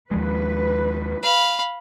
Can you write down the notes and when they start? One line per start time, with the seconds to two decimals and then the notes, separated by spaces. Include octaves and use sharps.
0.11 D#2 F3 G#3 B4
1.23 F5 B5